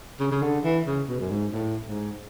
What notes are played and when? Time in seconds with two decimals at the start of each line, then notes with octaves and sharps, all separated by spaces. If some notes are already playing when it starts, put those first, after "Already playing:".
0.20 C#3
0.32 C#3
0.42 D3
0.64 E3
0.86 C#3
1.09 B2
1.20 F#2
1.30 G#2
1.53 A2
1.86 G#2